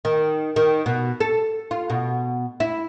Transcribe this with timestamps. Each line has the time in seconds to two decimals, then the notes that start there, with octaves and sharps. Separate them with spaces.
0.05 D#3
0.56 D#3
0.86 B2
1.20 A4
1.71 F4
1.90 B2
2.60 E4